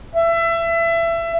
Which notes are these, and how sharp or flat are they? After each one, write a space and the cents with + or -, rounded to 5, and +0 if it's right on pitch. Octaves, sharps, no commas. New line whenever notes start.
E5 +25